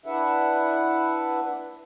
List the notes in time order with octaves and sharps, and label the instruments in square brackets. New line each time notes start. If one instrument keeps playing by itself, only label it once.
[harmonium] D4 E4 B4 E5 F#5